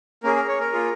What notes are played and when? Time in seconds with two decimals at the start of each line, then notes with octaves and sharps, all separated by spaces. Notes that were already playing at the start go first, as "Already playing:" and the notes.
0.23 A#3 C#4 G#4 A#4
0.36 A#4
0.48 C#5
0.60 A#4
0.72 A#3 F4 G#4